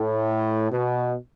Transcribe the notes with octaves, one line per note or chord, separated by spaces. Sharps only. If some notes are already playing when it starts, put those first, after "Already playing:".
Already playing: A2
B2